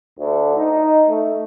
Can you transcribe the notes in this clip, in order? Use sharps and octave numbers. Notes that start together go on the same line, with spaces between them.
D2
D#4
A3